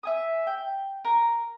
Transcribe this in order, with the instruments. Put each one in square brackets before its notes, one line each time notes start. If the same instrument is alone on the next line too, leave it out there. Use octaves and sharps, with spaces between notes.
[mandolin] E5 G#5 D#6
G5
A#4